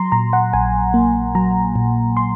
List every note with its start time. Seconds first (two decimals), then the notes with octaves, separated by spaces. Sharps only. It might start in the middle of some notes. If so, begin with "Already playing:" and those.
Already playing: F#3 A#5 C6
0.12 A#2 A#5
0.33 F#5
0.53 A#1 G#5
0.94 A#3
1.35 F#3 A#5
1.76 A#2
2.17 C6